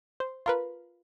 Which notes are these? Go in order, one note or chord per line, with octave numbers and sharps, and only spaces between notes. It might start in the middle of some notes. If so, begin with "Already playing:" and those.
C5
F4 A#4 B4